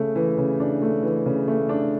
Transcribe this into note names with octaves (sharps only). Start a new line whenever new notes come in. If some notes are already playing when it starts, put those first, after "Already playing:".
Already playing: C#3 A3
E3
C#3
D4
A3
E3
C#3
A3
D4